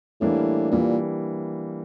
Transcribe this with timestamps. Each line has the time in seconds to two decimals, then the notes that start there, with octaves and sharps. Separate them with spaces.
0.21 A2 E3 G3 A#3 D4
0.71 A#2 E3 G3 A#3 D4